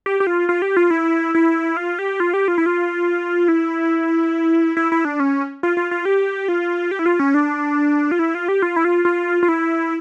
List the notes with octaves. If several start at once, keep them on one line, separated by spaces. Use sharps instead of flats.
G4
G4
F4
F4
G4
F4
E4
E4
F4
G4
F4
G4
F4
E4
F4
E4
E4
E4
D4
C#4
F4
F4
F4
G4
F4
G4
E4
F4
C#4
D4
F4
E4
F4
G4
F4
E4
F4
F4
F4
E4